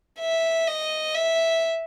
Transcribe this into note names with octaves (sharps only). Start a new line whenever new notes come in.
E5
D#5
E5